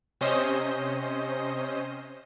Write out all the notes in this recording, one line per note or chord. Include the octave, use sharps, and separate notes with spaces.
C3 C#4 C5 D#5